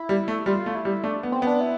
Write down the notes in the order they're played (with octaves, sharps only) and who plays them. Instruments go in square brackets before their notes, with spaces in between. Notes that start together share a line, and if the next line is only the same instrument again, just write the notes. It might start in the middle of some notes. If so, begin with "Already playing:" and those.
Already playing: [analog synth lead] E4
[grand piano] G3
A3
[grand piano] G3 [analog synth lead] F4
[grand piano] A3
[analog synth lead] E4
[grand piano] G3
[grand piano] A3 [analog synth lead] D4
[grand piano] B3
[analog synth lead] C4
[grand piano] B3 [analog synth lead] D4
[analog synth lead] E4